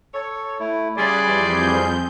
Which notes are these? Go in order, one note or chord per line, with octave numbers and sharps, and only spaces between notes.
A4 C#5
A3 E4
C#3 G3 G#4 D5 G#5 B5 C6 F#6
F2 E3 G3 G6